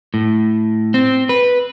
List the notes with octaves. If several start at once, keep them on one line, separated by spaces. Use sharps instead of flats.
A2
C4
B4